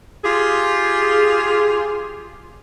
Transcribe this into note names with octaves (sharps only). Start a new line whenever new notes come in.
F4 G4 G#4